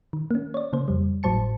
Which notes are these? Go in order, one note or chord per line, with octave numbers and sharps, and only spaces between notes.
D#3
A#3 C#4
C#5 D5
C#3 A#3 C5
F2 G3
G#1 A2 F#3 C5 A5 C#7